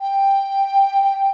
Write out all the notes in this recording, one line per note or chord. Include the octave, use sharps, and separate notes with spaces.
G5